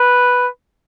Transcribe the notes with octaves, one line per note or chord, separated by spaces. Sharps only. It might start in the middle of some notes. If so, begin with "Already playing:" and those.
Already playing: B4